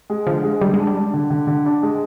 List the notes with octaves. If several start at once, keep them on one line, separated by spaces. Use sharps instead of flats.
G#3
D3 F3
G#3
D3 G3
G#3
D4
G3
D4
D3
D3
D3
D4
G#3